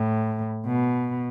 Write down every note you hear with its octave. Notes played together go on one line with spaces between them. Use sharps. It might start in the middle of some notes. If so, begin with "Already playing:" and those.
Already playing: A2
B2